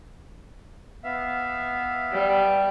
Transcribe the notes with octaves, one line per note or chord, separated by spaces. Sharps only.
B3 E5 F5
G3